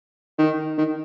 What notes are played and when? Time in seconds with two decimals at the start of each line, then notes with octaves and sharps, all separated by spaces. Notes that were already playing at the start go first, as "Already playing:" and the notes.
0.39 D#3
0.78 D#3